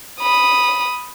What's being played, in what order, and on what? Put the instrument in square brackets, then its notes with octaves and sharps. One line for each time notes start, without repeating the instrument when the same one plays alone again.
[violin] B5 D#6